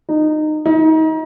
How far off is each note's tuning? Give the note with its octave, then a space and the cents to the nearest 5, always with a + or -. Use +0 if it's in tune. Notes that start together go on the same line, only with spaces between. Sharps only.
D#4 -20
D#4 +30